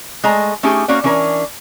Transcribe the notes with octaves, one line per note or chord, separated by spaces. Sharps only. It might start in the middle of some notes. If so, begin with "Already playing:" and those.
G#3 A3 D#5 A#5
A3 C#4 D#4 G4 G#4
A#3 C#4 F#4 D5
E3 C#4 D4 A#4